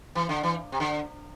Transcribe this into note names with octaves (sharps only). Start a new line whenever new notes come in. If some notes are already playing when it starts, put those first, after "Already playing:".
E3
D3
E3
C3
D3